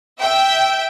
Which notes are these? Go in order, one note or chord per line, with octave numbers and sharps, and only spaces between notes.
E5 G5